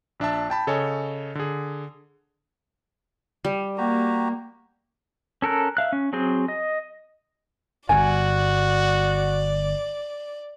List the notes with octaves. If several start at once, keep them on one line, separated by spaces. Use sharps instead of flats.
A#1 D4 E5 A5
G5 A5 B5
C#3 A4 C#5 D#5 G#5
D3 G#4
G3
A#3 F#4 G4 A#5
C#4 A4 A#4 F#6
E5 F5 F#6
C#4
F#3 C4 G#4 C5
D#5
G1 G2 F#4 D5 G#5